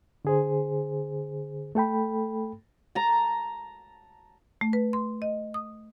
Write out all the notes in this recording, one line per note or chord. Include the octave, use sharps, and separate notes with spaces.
D3 G#4 C5
A3 A4 G5 B5
A5 A#5
A3
B4
C6
D#5
D#6